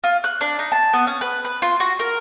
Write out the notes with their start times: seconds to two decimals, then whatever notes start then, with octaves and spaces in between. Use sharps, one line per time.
0.04 F4
0.24 F#6
0.41 D4
0.59 D#4
0.72 A5
0.93 B3
1.07 C#4
1.21 B4
1.45 B4
1.62 F4
1.80 F#4
1.99 A#4